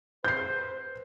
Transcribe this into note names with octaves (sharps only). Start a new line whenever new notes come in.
B4 C5 G6 C7